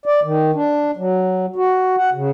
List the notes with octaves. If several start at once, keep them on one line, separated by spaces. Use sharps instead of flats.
D5
D#3
D4
F#3
F#4
F#5
C#3